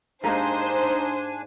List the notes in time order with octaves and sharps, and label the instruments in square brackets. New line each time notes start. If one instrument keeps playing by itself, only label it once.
[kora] G#2 A#3 G4 [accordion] D4 G#5 [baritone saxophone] D#4 [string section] C5